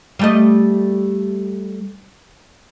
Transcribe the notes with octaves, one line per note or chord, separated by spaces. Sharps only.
G3 A3 D#5